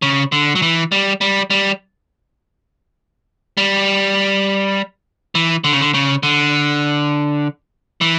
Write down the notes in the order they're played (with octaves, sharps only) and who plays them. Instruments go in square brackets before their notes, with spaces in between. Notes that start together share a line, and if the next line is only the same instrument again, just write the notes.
[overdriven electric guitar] C#3
D3
F#3
E3
G3
G3
G3
G3
E3
D3
C#3
D3
C#3
D3
E3